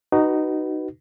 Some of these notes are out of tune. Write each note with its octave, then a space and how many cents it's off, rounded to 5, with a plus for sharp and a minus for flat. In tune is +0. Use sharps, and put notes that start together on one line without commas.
D#4 -10 F#4 +25 B4 +0